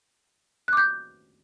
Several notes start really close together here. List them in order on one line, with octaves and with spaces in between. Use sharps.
F#6 D6 G6